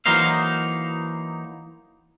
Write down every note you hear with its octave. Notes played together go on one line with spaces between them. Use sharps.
E3 F#3 A#3 D#4 C5 F5